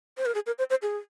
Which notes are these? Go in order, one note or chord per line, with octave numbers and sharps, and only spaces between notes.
C5
A#4
G#4
A#4
C5
C5
G#4